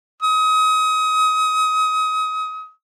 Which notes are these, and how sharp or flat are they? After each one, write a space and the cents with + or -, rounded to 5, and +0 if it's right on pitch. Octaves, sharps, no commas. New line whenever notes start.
D#6 +30